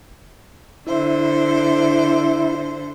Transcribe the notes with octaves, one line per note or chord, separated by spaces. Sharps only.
D3 E4 C5